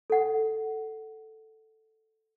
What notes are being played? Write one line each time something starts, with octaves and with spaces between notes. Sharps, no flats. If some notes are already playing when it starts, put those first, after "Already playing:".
A4 F#5